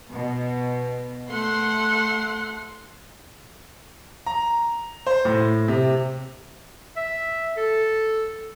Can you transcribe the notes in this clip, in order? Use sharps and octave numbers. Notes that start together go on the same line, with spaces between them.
B2
A3 F#5 C6
A#5
C5
A2
C3
E5
A4